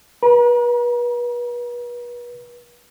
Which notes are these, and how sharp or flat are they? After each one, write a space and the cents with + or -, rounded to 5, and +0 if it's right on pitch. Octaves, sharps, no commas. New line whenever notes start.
B4 -35 A#5 +35